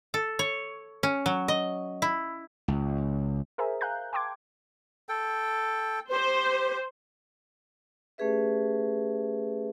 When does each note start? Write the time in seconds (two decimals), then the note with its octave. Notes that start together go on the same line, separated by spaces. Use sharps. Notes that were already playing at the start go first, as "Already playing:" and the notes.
0.14 A4
0.39 C#5
1.03 C#4
1.26 F#3
1.48 D#5
2.02 E4
2.68 C#2
3.58 G#4 A#4 C5 E5 G#5 A#5
3.81 F5 G#5 A#5 F#6 G6
4.13 G5 A5 C6 D6 G#6
5.09 A4 G5
6.12 G4 C5
8.18 A3 C#4 G4 G#4 B4 E5